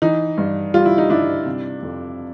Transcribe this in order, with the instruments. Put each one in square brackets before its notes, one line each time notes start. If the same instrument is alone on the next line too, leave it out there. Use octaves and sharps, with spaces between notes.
[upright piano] E3 D#4
G2
G3 F4
E4
D#4
G2 D4 E4
C3
F2